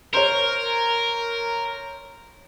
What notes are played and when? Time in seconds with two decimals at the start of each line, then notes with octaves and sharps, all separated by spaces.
0.14 A#4 C5 C#5